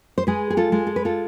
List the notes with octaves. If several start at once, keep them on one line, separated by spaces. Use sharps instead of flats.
C5
G#3 G#4 B4
G#4
F4 A4
G#3
A4
B4
F4 A4